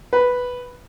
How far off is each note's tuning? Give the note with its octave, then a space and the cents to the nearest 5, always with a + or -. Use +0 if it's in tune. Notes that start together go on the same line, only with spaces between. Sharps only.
B4 +0